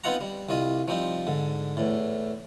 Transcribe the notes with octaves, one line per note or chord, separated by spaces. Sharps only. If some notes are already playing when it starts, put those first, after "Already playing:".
B3 C4 D#4 F4 F#5 A#5
G3
C2 G3 F4 D#5
F3 G3 C4 D#4
G#2 D3
E2 A2